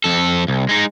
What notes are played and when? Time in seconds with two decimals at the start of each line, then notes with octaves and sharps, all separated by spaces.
0.04 F2 A4
0.48 C2
0.69 G#3 D#4